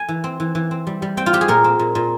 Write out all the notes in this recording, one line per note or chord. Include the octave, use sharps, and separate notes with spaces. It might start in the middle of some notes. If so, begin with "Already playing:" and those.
Already playing: G#5
E3
C4
E3
E3
C4
G3
G3
C4 G5
F4
C4 G4
G#4
A#2 A#4
C4
A#2
A#2